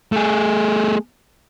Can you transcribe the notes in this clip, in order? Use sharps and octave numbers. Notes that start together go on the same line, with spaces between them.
A3 G#4